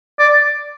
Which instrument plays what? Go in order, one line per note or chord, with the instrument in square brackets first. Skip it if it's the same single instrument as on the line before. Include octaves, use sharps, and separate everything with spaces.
[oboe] D5